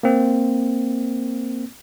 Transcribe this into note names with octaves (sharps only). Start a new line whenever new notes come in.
A#3 C4